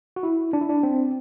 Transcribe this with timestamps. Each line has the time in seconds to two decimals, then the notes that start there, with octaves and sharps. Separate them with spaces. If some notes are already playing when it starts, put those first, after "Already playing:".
0.16 F#4
0.23 E4
0.53 D4
0.61 E4
0.69 D4
0.83 C4